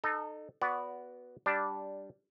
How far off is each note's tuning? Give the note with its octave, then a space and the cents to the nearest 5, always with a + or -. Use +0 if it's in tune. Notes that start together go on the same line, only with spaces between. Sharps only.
D#4 -30 A4 +0
B3 +0 F#4 +0 D5 -25
G3 +0 D4 -5